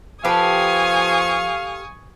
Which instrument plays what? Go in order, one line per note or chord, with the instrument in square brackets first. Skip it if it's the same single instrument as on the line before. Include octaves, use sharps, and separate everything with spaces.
[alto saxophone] F3 [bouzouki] G4 A4 B4 [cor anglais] F5 [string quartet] G#5 C#6 D#6